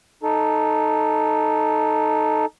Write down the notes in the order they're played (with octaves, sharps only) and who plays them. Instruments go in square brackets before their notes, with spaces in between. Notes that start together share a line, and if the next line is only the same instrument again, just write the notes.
[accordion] D#4 A4